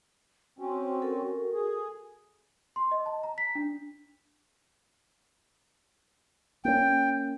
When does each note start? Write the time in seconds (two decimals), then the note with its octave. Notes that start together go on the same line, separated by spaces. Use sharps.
0.59 C4 C#4 F#4
1.02 A4 A#4
1.53 G#4
2.76 C6
2.91 D#5
3.06 A5
3.23 A#5
3.38 B6
3.55 D4
6.65 A#3 C#4 G5